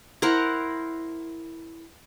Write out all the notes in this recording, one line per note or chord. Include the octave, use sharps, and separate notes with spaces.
E4 A#4 C5 F#5